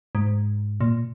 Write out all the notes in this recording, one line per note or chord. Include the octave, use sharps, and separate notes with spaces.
G#2
A#2